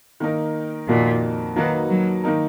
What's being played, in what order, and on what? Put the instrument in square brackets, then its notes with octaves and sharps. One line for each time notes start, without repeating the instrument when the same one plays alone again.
[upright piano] D#3 A#3 D#4 A#4
[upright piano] F2 D#3 A#3 D#4 F#4 [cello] A#2
[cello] D#3 [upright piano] F#3 A#3 D#4 F#4 B4
[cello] F#3
[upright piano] D#3 A#3 D#4 A#4